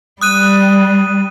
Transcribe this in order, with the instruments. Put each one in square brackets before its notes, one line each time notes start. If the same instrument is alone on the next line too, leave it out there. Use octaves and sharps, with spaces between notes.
[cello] G3 [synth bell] D#6 F#6 D#7